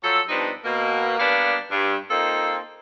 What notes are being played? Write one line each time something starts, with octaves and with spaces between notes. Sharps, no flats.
F3 F#3 A4
G2 F3 B3 D4 D#4
B2 A#3
G3 A#3 B3 D4 F5
G2
A#3 C4 D#4 F4 A4